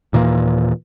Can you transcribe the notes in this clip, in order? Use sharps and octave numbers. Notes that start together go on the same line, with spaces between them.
D#2 A#2 E3 A#3